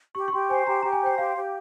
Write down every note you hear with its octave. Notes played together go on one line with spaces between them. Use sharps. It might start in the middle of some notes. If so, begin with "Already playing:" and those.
G4 C#6
C#6
G4 C6
C5 G#5
G4 A#5
G4 A#5
G#5
C5 G5
G4 F5
G4